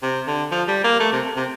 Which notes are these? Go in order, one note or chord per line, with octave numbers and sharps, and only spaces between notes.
C3
D3
F3
G3
A#3
A3
C3
C3